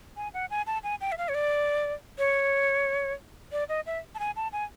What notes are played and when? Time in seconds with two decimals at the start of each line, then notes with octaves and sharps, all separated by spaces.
0.17 G#5
0.34 F#5
0.50 G#5
0.67 A5
0.83 G#5
1.01 G5
1.12 E5
1.18 F5
1.29 C#5
1.35 D5
2.18 C#5
3.52 D5
3.69 D#5
3.86 E5
4.15 A5
4.19 G#5
4.36 A5
4.53 G#5